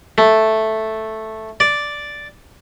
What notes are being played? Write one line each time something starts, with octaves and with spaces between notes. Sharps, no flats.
A3
D5